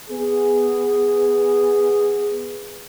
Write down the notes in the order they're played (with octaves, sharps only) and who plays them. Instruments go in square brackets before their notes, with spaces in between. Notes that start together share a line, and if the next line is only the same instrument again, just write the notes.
[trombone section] B3 G#4